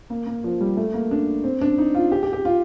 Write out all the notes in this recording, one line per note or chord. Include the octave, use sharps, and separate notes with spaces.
A#3
A#3
F3
G3
A3
A#3
D4
C4
D4
D#4
F4
G4
G4
G4
F4